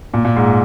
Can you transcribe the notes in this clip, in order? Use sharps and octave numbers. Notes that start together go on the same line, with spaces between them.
A#2
A#2
G#2